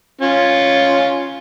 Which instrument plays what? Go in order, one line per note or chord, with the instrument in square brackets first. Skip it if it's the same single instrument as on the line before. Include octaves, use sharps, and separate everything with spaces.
[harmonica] C#4 F4